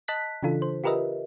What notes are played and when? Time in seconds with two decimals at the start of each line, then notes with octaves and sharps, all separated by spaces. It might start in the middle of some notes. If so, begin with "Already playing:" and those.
0.08 D#5 A5 F#6 B6
0.43 C#3 E3 D4 F4 A4
0.62 C5
0.84 F4 G4 A#4 B4 D#5 E5